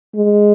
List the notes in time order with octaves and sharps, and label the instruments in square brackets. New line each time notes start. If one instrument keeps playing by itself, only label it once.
[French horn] G#3